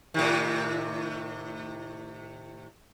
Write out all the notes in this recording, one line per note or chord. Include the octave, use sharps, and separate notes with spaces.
A2 C3 D#3